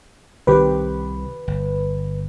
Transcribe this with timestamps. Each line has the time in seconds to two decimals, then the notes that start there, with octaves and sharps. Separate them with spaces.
0.47 C2 C3 D#3 G4 B4
1.48 G1